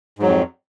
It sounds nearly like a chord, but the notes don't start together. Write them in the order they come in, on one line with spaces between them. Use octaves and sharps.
G#2 F#3 F2